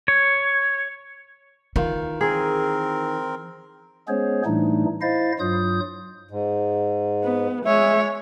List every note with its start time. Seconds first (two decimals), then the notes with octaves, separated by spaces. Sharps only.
0.08 C#5
1.76 D#3 E3 F4
2.21 C4 G#4 A#4
4.08 G#3 B3 C#4 G#4 C5 C#5
4.46 A2 E3 G3 A3 D4 D#4
5.02 E4 C5 D#5 F5 A6
5.40 G2 F#3 F4 D#6 G6
6.31 G#2
7.24 B3
7.65 G#3 C#5 E5